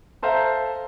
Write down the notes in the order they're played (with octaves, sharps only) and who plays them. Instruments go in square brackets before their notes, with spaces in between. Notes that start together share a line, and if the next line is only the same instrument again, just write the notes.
[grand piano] A4 C5 E5 F5 A5 A#5